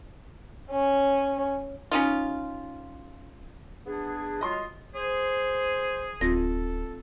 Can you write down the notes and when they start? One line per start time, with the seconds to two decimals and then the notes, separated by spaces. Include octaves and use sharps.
0.71 C#4
1.91 C#4 D#4 F4
3.86 B3 D4 G#4
4.41 F#3 G#3 F4 D#5 C6
4.95 G#4 C5
6.21 D1 C4 F4 A4 A#6